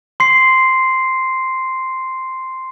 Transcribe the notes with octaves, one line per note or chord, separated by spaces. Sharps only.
C6 C7